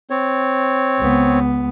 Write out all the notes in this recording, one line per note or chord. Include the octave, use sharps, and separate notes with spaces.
C4 C#5
C#2 B3